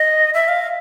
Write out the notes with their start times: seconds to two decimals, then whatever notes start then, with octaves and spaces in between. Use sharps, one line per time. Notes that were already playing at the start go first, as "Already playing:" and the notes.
Already playing: D#5
0.34 E5
0.48 F5
0.62 F5